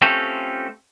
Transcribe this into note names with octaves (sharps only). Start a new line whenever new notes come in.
A3 C4 C#4 F4 G4 A4